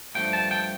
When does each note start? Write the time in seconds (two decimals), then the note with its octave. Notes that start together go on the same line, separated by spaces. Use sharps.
0.15 G2 F3 A3 G5
0.33 A5
0.51 G5